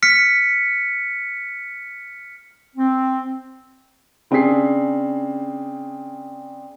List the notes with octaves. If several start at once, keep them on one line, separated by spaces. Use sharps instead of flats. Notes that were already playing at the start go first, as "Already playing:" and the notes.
F6 B6 C#7
C4
C#3 C4 D4 G#4 B6 C7